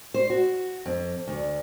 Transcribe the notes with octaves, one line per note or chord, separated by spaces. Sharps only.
C5
F#4
F2
D2